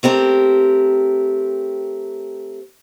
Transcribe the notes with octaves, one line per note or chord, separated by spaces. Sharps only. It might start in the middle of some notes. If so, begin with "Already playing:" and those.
A3 C4 G4 A#4